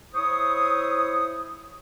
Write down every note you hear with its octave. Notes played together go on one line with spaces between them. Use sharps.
E4 C5 C#5 C#6 D#6